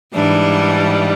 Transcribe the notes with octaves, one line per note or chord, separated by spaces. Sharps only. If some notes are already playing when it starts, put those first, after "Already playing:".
G#2 E3 G3 D4